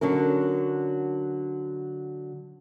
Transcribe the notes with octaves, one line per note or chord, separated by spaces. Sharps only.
D3 F#3 C#4 A#4